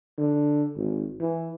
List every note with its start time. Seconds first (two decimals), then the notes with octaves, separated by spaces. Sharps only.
0.18 D3
0.77 G#1
1.20 E3